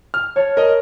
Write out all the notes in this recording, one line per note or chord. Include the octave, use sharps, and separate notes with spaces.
F6
C#5 A5
A#4 D#5